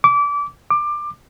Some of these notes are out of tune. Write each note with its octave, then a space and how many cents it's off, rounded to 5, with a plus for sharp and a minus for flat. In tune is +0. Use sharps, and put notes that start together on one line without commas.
D6 -25
D6 +20